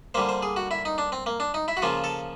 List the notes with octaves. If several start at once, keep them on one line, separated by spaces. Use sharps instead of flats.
D3 G3 A#3 C5
C5
G#4
F#4
E4
D#4
D4
C4
A#3
D4
D#4
E4
F#4
C#3 F3 A#3 F4
A4